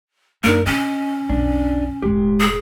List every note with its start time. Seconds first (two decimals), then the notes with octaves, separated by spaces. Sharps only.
0.44 F#2 A#3 D4 D#4 A#4
0.66 C3 C4 C#4 D#5
1.29 B1 F2 D4
2.02 E1 A1 G#3 G4
2.40 G#4